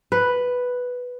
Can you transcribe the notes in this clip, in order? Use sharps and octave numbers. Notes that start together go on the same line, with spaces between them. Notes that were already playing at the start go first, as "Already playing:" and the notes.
B4